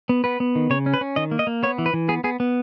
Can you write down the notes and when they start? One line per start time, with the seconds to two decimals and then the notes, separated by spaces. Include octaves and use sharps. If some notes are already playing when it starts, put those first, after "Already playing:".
0.09 B3
0.24 B3 B4
0.40 B3
0.55 D#3
0.70 C#3 C#5
0.86 C#4
0.94 B4
1.01 C#4
1.16 D#3 D#5
1.31 A#3
1.39 D#5
1.47 A#3
1.63 B3 C#5
1.78 E3
1.86 B4
1.94 E3
2.09 B3 G#4
2.24 B3 G#4
2.40 B3